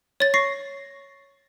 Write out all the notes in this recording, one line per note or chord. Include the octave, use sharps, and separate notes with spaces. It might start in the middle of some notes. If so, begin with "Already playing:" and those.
C#5 A6
C#6 A#6 C7